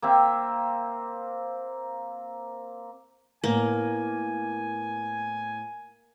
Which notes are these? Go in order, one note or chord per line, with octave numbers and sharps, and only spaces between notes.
A#3 C4 E5
A2 A#3 B3 G#5